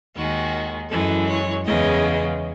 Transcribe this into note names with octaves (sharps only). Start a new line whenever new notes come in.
D#2 D#3 G#3 F#4
F#2 E3 G#3 A4
C#5
E2 C#3 G#3 D#5